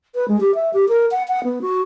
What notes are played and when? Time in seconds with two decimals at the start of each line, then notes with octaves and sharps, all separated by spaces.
0.15 B4
0.28 G#3
0.41 G4
0.55 E5
0.74 G4
0.89 A#4
1.11 F#5
1.28 F#5
1.44 B3
1.62 F#4